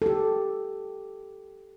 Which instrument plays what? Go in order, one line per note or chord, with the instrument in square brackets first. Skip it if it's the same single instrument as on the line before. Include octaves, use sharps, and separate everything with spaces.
[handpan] G4 A4